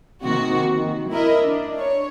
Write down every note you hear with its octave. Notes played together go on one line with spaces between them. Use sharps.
C3 D#3 A#3 F#4
D#3
E4 A#4 D#5 E5
D4
C#5